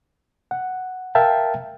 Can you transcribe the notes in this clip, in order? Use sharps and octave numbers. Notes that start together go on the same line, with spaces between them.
F#5
A#4 E5 F5 G5 A5